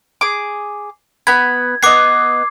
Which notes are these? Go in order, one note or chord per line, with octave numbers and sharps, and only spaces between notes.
G#4 D6
B3 B5 G#6
B3 D#5 D6 C7